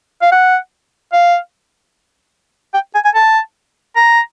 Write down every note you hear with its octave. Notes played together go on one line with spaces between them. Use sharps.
F5
F#5
F5
G5
G#5
G#5
A5
A#5